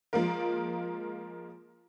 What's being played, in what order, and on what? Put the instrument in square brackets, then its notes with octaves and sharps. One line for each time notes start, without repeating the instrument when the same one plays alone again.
[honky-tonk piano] F3 G#3 A#3 F4 A#4